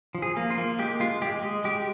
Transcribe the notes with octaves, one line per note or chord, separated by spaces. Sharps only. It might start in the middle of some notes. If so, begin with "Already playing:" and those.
F3
G#4
A#3
F4
A#3
G#3 G4
G#3 F4
G#3 G4
G#3
G#3 G4